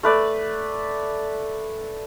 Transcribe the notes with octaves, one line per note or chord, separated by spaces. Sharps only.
A3 B4 D5